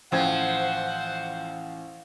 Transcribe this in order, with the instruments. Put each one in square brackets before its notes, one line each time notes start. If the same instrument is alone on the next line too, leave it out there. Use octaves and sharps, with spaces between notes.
[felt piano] A1 G5 G#6 [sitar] F3 [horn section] C5 F#5